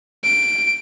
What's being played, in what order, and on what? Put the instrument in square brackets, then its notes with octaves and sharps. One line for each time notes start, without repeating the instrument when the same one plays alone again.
[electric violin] D7